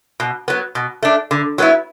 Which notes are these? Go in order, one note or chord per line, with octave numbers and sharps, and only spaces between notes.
B2
F#3 B3
B2
A3 D4
D3
F#3 B3 E4